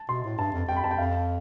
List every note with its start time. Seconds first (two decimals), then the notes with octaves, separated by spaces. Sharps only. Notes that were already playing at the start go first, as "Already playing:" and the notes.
Already playing: A5
0.09 B2 C6
0.24 A2
0.39 G2 A5
0.53 F2
0.69 F2 G5
0.76 B5
0.83 F2 A5
0.91 G5
0.98 F2 F5